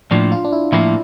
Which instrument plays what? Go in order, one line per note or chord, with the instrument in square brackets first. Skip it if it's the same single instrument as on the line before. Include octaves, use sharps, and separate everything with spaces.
[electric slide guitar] A2 F3 A#3 [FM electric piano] D4
[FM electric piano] F4
D4
E4
[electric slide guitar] A2 F3 A#3 [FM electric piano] E4